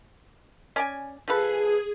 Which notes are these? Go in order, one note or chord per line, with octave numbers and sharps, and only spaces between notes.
C#4 D5 G#5
F3 G#4 A4 B4